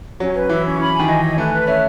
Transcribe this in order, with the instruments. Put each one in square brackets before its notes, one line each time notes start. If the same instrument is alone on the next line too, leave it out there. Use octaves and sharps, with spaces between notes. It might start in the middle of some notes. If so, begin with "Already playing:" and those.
[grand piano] F#3 [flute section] C#4
[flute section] B4
[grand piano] E3 [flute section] E4
[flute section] C#4
B5
G#5
[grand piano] D#3
[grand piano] E3 [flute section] D#5
[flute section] G#5
[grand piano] A3 [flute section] B4
[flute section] B4
[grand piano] C#4 [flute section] E5